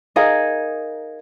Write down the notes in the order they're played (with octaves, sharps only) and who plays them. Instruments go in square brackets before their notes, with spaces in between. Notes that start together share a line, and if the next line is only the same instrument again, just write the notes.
[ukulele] D#4 G#4 A#4 F5